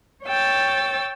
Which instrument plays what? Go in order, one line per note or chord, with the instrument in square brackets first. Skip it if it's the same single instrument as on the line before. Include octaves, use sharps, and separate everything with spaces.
[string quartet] C#5 G5 E6 A6